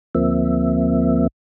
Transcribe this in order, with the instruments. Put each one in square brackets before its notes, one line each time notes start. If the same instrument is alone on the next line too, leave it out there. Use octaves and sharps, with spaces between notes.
[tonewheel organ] D2 F3 A#3 C4 E5